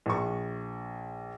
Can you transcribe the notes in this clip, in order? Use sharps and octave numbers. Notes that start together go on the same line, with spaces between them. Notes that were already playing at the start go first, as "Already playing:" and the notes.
A#1 C#6